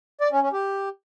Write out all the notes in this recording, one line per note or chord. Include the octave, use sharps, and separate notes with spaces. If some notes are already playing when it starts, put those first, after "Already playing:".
D5
C#4
C#4
G4